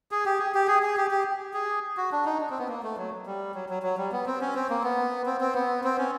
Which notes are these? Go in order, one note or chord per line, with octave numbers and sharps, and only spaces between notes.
G#4
G4
G#4
G4
G#4
G#4
G4
G4
G#4
F#4
D4
D#4
D4
C4
B3
A#3
A3
F#3
G3
F#3
F#3
F#3
G3
B3
C4
C#4
C4
A#3
B3
C4
C4
B3
C4
C#4